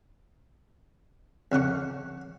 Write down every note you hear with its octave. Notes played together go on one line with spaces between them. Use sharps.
F2 C#3 F#5 C#6